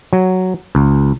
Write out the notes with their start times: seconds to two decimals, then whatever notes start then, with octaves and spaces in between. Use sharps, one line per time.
0.13 F#3
0.75 C#2